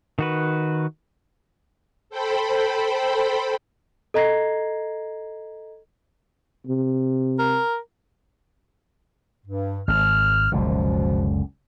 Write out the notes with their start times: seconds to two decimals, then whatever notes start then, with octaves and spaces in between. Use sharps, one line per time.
0.19 D#3 F#4 B4
2.10 A4 C5 G5 B5
4.14 A4 D#5 A#5 G#6 A#6 C7
6.67 C3
7.39 A#4
9.46 G2
9.88 G#1 F6
10.52 F#1 C#2 B2 D3 F3